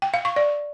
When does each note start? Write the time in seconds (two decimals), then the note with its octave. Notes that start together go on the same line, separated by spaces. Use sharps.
0.02 G5
0.14 F5
0.25 C#6
0.36 D5